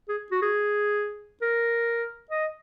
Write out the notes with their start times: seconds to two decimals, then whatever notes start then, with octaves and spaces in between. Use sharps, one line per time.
0.09 G#4
0.31 F#4
0.42 G#4
1.42 A#4
2.31 D#5